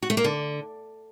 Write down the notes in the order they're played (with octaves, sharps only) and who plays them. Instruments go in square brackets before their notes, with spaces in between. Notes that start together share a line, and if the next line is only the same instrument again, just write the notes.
[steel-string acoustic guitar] F#4
A3
A#3
D3